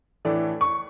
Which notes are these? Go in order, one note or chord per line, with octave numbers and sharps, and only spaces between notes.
A2 E3 A3 D4
C#6